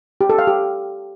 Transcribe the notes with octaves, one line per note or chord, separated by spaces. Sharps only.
G4
A4
F5
G4